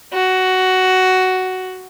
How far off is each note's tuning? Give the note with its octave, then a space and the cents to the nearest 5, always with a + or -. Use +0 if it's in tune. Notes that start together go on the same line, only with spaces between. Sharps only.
F#4 +10